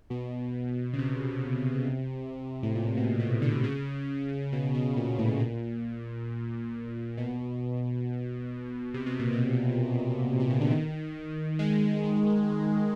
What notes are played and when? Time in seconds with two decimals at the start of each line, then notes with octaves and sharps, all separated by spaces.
0.10 B2
0.93 C#3
0.98 C3
2.63 A2
2.75 A#2
2.97 B2
3.20 B2
3.42 D3
3.53 D3
3.64 C#3
4.52 B2
4.74 B2
4.96 A#2
5.18 A2
5.40 A#2
7.17 B2
8.94 C3
9.06 B2
9.19 A#2
9.33 B2
10.40 C3
10.50 C#3
10.61 D3
10.71 D#3
11.59 G#3